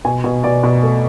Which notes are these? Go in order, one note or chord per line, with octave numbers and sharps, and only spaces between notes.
B2 G#5
B2
B2 D5
B2
A3